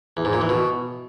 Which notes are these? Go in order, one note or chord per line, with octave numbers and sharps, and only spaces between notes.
E2
G#2
A#2
E3
B2